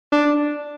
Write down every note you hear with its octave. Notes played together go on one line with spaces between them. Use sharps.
D4